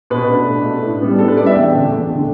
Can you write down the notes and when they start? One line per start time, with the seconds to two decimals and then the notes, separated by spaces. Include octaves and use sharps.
0.10 B2 B4
0.29 A3 D4
0.47 B2
0.64 A3 D4
0.83 A2
1.01 G3 B3 D4
1.19 A2 A4
1.28 B4
1.37 G3 B3 D4 D5
1.46 E5
1.55 E2 G5
1.73 D3 A3 D4
1.91 E2
2.09 D3 A3 D4